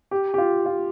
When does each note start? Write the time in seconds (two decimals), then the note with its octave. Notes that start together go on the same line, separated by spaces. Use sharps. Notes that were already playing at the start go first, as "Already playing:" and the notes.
0.11 G4
0.34 G4
0.38 F4
0.66 F4